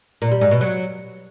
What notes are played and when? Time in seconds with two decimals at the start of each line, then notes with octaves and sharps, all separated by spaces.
0.22 A#2
0.32 G3
0.41 G#2
0.51 B2
0.61 F#3